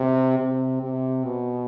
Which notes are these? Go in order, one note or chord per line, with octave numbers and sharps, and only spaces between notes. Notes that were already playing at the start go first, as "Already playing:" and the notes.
Already playing: C3
C3
C3
B2